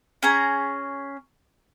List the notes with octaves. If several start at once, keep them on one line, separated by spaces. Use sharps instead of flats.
C#4 G#4 A#5